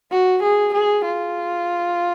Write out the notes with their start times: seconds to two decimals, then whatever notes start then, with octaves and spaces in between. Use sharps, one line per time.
0.12 F#4
0.43 G#4
0.75 G#4
1.05 F4